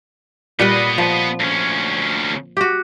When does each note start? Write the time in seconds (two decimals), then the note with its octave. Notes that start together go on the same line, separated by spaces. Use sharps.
0.59 A#2 G3 B3 B4 D#5
0.98 F3
1.40 D2 C#4
2.57 F#4 G4